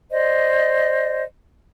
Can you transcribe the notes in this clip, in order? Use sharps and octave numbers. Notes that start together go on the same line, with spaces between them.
C5 D5 D#5